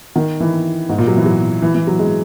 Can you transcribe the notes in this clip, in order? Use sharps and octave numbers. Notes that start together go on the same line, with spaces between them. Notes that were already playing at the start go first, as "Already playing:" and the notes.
D#3
E3
G#2
A#2
F#3
E3
F#3
E3
E3
F#3
G#3